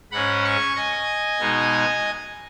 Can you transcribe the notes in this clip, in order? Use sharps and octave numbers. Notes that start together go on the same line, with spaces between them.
G#2 G#3 C#4 F#5 B5
G#5 C#6
D#5 G#5
B2 G#3 D#4